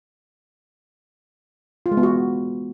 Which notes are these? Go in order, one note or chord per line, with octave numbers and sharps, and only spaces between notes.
F4
G#3
B3
F#4